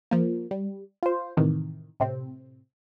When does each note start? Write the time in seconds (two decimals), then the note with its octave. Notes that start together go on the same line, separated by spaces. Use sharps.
0.11 F3 A#3
0.51 G3
1.03 F4 C5
1.37 A2 C3 D#3 E3
2.00 A2 C3 C4